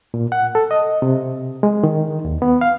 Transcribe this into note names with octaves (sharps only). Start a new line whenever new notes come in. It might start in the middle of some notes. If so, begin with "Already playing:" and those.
A#2
F#5
A4
D#5
C3
G#3
D#3
D#2
B3
F5